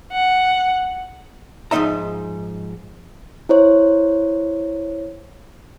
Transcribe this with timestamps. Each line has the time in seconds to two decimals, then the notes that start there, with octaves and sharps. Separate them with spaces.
0.12 F#5
1.71 G#2 F3 C4 D#4 E5 A#5
3.49 E4 C5 C#5